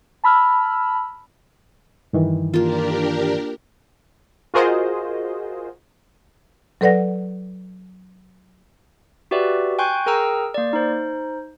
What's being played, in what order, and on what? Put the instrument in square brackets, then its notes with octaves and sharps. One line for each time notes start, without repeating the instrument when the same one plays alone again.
[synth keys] A5 B5 E6 F6
[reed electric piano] G2 D#3 E3
[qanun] A#3 F4 [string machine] D4 G4 A#4
[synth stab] F4 F#4 G#4 A#4 C5 D#5
[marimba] F#3 A4 B4 D5 F#5 A#6
[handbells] F#4 G4 B4 D5 E5
G5 G#5 C6 C#6 F#6 G6
G#4 A#4 G5 A#5 E6
A#3 D5
D#4 C5